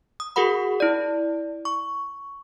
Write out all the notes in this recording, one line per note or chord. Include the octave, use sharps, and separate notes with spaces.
D#6
F#4 G#4 A#4 F#5 B5
E4 D5
C#6